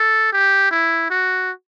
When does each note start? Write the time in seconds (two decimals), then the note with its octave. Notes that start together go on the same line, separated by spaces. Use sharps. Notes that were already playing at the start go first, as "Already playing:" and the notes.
Already playing: A4
0.33 G4
0.71 E4
1.10 F#4